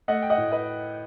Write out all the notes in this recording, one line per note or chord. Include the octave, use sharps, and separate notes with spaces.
A3 D#5 F#5
G5
D#5 F#5
A2
B4 D#5